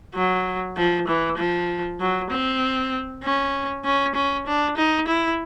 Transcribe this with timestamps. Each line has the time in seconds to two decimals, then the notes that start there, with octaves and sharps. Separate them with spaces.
0.14 F#3
0.77 F3
1.08 E3
1.38 F3
2.00 F#3
2.30 C4
3.23 C#4
3.84 C#4
4.15 C#4
4.47 D4
4.77 D#4
5.08 E4